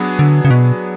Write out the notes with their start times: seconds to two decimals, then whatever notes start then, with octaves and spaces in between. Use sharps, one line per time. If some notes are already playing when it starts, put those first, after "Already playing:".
Already playing: F#3 B3 D4 G#4
0.19 D3
0.45 C#3
0.50 B2